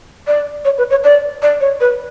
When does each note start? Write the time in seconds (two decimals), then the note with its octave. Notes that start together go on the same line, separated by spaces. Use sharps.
0.27 D5
0.65 C#5
0.78 B4
0.90 C#5
1.04 D5
1.42 D5
1.61 C#5
1.80 B4